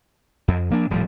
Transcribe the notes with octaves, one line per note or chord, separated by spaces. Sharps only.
F2
F3 A#3 D4
D#1 A2 F3 G3